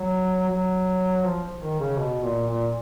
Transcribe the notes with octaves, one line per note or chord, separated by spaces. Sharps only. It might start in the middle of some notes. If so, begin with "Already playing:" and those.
Already playing: F#3
F#3
F3
D#3
C#3
B2
A#2
A#2